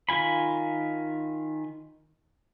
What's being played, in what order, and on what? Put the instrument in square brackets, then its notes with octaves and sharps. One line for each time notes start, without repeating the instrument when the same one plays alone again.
[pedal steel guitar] D#3 F4 G#5 B5